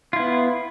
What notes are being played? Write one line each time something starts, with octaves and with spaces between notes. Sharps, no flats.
B3 E4 F4